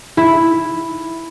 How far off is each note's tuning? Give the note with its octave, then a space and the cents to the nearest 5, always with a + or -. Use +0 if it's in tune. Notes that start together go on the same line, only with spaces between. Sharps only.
E4 +0